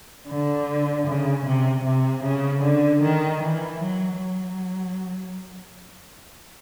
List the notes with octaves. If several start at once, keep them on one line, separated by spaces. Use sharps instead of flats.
D3
C#3
C3
C3
C#3
D3
D#3
E3
F#3
F#3